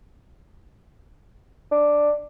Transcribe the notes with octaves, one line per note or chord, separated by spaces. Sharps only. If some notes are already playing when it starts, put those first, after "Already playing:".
D4